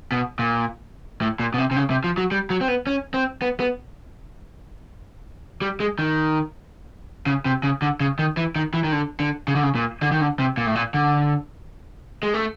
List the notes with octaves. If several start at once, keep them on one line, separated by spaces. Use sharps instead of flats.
B2
A#2
A2
A#2
B2
C3
C3
C#3
C3
F3
F#3
G3
F#3
C4
B3
C#4
C4
B3
B3
G3
G#3
D#3
C#3
C3
C#3
D3
C#3
D#3
E3
D#3
E3
D#3
D3
D3
C#3
D3
C#3
A#2
D3
D#3
D3
C3
A#2
A2
A#2
D3
G#3
A3